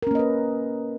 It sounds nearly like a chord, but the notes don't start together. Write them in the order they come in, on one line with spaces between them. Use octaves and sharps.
A#4 C#4 A#3 D#5 B4